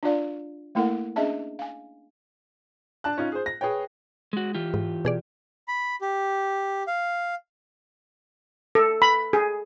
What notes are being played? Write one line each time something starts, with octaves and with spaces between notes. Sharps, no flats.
D4 F4 D5 F5
A3 A#3 E4 A4 A#4 F#5
C#4 D4 G#4 D#5 E5 A5
F5 G#5
D4 A5 F#6
C#4 D#4 F4
G#4 C5
A#6
G#4 B4 C#5 G5
G#3 F#4
E3 F4 G4
G#2
B2 G#4 D5
B5
G4
F5
A4
B5
G#4